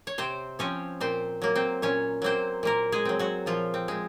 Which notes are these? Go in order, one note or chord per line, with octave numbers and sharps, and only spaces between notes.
C#5
C3 C4 C5
F3 C4 C#4 C#5
A#2 C4 C5
F#3 A#3
C4 C5
A#2 C#4 C#5
F#3 A#3 C4 C5
A#2 A#3 A#4
G#3 G#4
F#3 C4
F#3 F#4
A#2 F3 F4
C4
G#3 C4